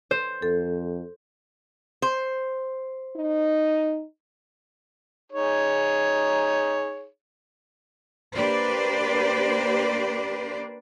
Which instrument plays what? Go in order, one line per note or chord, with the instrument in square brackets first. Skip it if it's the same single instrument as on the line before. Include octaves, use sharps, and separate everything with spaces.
[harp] C5
[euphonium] F2 [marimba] A4
[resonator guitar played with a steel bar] C5
[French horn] D#4
[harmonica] D#4 G#4 C#5
[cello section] A#3 D4 G4 B4 C5 D5